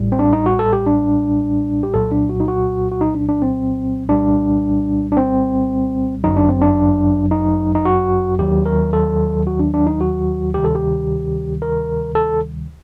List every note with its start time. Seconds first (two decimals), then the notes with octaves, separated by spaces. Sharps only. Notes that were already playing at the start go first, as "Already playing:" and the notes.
Already playing: A1 A2 G3
0.12 C4
0.19 D4
0.33 D#4
0.46 F#4
0.59 A4
0.73 G4
0.86 D4
1.83 G4
1.94 C2 A#2 F#3 A4
2.12 D4
2.30 F#4
2.40 D#4
2.48 F#4
2.92 F#4
3.01 D#4
3.15 D4
3.29 D4
3.42 C4
4.08 C2 A#2 G3 D4
5.12 D4
5.17 C4
6.24 G1 F#2 F#3 D#4
6.36 D4
6.49 C4
6.61 D4
7.31 D#4
7.75 D#4
7.85 F#4
8.39 D#2 D#3 F#3 G4
8.66 A#4
8.93 A4
9.47 F#4
9.59 D4
9.74 D4
9.87 D#4
10.01 F#4
10.54 D2 C3 D#3 G3 G4
10.64 A4
10.75 G4
11.62 A#4
12.15 A4